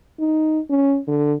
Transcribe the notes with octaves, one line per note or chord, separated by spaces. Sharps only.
D#4
C#4
D3